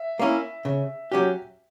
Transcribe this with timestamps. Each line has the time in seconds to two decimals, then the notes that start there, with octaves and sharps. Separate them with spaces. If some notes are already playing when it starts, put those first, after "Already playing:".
Already playing: E5
0.19 A#3 C#4 E4
0.65 C#3
1.12 F#3 C#4 G4